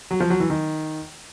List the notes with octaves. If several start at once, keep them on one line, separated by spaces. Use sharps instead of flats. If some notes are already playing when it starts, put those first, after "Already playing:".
F#3
F3
F#3
E3
D#3